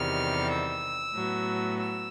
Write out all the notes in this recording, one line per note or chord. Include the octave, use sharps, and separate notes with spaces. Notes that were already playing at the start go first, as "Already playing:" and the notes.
Already playing: E2 C3 D#3 G3 F6
E6
A2 F#3 B3
E6